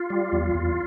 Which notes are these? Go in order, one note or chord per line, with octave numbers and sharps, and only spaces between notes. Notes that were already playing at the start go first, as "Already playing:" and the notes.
Already playing: F4
G3
E2
E2